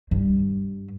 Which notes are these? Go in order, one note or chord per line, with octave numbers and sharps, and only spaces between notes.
G2